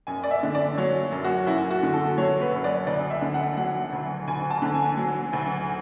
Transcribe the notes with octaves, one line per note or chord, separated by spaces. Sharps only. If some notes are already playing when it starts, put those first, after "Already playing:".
F#2 G#5
D5
E5
D3
D5
F#3 C#5
F#2
F#4
F#2 E4
F#4
D3
A4
F#3 C#5
B4
F#2
D5
D2 D5
E5
D3
F#5
F#3 F#5
D2
D2 G#5
A5
D3
G#5
F#3
D2